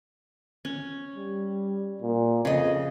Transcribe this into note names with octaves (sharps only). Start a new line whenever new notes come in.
C#4
G3
A#2
F2 C#3 D#5